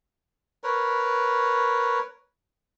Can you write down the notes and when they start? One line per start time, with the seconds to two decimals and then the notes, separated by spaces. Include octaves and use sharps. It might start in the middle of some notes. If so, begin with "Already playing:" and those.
0.64 A#4 B4 C#5